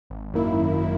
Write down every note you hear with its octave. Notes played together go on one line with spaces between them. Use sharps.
G#1
F#2 D#3 A#3 E4
G#1
E4